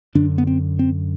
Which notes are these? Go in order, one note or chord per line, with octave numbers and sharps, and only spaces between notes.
F#2 D3 D4
B3
C4
C4